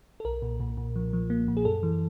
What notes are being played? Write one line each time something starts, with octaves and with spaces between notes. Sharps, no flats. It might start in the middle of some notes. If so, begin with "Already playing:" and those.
A4
B1 A#4
A#2
A#2
A#2
F3
F3
A#3
A#2
G#4
F#2 A4
E3